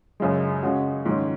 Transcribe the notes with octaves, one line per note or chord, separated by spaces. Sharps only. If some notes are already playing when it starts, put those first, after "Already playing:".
F#2 C#3 G#3
C#3 G#3 C#4 F#4
G#2 D#3 G#3 C#4